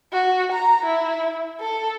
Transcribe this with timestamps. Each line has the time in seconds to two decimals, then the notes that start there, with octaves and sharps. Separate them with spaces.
0.12 F#4
0.52 A#5
0.85 E4
1.61 A4